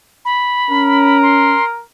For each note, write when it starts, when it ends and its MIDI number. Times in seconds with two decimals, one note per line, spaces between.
0.25 1.21 83
0.70 1.56 61
0.70 1.84 70
1.22 1.64 84